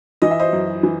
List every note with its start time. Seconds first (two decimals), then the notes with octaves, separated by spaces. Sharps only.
0.22 E3 D#5
0.31 E5
0.40 C5 D#5
0.53 F#2
0.83 E3